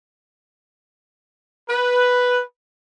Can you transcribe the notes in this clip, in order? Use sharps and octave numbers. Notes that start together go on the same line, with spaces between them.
B4